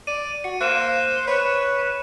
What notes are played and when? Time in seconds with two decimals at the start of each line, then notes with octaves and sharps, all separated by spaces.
0.07 D5 D#7
0.44 F#4 C#7
0.61 A#3 C5 F#6 E7
1.28 B4 C#5